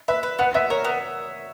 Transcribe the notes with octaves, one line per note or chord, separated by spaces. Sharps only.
B4 E5
B4
B3 F#5
B3 E5
A#4 C#5
B3